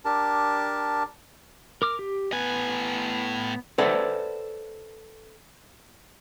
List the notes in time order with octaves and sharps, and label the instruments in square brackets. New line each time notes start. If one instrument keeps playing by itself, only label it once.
[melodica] D4 G4 A#4 A5
[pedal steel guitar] A#4 D6 F6
G4
[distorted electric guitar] A2 G#5 [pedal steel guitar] B3 B4
[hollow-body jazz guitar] A4 B4 C5 D5 E5 F#5